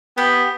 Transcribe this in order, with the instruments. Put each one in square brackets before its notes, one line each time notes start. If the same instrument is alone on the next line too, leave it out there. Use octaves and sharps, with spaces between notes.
[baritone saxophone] B3 [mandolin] G4